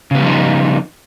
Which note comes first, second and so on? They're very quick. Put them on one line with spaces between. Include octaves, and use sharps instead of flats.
C#3 B3 G3 F3 D#4